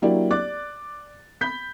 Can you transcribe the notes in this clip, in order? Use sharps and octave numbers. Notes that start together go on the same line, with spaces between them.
F#3 A#3 D4 E4 G4 D5
D5 D6 F#6 A6
B5 G6 B6